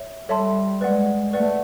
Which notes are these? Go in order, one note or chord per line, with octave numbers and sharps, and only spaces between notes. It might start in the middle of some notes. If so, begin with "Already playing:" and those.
Already playing: C#5 E5
G3 A4 C#5 E5 A5 C6
G#3 B4 D5 F#5
A3 B4 D5 F#5